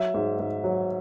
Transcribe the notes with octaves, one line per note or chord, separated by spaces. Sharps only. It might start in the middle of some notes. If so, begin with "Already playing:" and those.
Already playing: F#3 E5
G#2
G#2
F#3